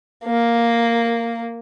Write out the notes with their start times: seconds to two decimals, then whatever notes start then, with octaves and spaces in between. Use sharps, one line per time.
0.24 A#3